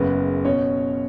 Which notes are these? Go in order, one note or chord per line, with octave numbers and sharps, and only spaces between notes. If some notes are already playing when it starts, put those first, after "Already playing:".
Already playing: F#1 F#2 C#3 B3 B4
B2 C#4 C#5